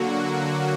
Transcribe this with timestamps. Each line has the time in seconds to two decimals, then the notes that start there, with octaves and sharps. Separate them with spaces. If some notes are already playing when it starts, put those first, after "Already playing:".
Already playing: D3 F#3 A#3 F#4